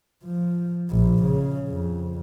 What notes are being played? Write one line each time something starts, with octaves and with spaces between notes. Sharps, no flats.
F3
A#1
C#3
F2